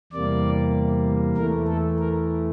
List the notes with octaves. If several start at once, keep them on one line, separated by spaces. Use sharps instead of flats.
E2 C3 G3 A#3 D5
E2 E3 A3 A#4
A4
A#4